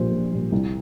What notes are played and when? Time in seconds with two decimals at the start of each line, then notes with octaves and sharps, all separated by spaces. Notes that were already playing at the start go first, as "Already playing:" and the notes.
Already playing: A#1 A#2 G3 C5
0.12 A#1
0.31 A#2 G3
0.52 C2